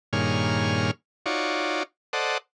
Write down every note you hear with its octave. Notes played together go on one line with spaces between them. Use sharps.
G2 A#2 D#3 G#4 C#5 F6
D#4 F4 F#4 C#5 D5
A4 C5 D5 D#5 F#5